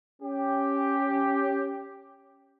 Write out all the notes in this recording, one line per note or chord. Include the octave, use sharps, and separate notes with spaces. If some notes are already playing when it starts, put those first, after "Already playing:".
C#4 G4